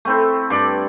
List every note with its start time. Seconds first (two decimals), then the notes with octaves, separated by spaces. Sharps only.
0.05 A3 C4 E4
0.50 G2 D5 A5